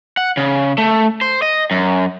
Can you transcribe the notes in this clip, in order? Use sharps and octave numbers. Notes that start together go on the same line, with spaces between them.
F#5
C#3
A3
C5
D#5
F#2